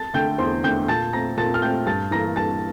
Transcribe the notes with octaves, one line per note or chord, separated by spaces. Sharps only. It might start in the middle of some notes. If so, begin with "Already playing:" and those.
Already playing: A5 A6
D3 A3 G5 G6
E2 C5 C6
D3 A3 G5 G6
A#2 A5 A6
A3 C4 A#5 A#6
A#2 A5 A6
F6
A3 C4 G5 G6
G2 A5 A6
E3 A#3 A#5 A#6
G2 A5 A6